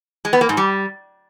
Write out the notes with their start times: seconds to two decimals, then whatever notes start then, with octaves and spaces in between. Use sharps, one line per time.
0.25 G#3
0.33 B3
0.41 A#3
0.49 G#2
0.57 G3